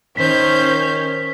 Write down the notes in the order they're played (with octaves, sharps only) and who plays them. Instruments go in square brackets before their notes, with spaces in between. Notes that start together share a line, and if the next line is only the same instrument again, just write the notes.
[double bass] D#3 [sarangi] C#4 [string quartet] C5 G6 [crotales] B6